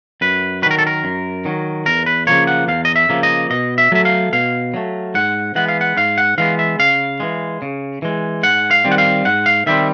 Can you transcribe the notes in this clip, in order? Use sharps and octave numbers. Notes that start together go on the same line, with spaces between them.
F#2 B4
D#3 F#3 A#4 B4
A4
A#4
F#2
D#3 F#3
E2 A#4
B4
C#3 F3 A#3 C#5
F#5
E2 F5
D#5
E5
C#3 F3 A#3
D#5
B2 D#5
E5
F#3 A3 E5
F5
B2 F5
F#3 A3
G#2 F#5
E3 G#3 B3 F#5
F5
F#5
G#2 F5
F#5
E3 G#3 B3 F5
E5
C#3 F5
E3 G#3
C#3
E3 G#3
G#2 F#5
F5
D#3 G3 C4
F#5
F5
G#2 F#5
F5
D#3 G3 C4 E5